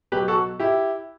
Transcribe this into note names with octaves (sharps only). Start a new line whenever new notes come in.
B2 F#3 G4 B4
F#4 A4
E4 G4